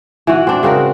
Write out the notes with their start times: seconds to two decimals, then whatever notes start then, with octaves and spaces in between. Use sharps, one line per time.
0.27 E3 F#4
0.47 C4 D4
0.63 C#3 C4 F#4 A#4